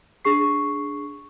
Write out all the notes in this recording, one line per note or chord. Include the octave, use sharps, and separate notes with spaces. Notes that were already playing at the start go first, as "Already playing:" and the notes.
D4 G#4 C#6 C7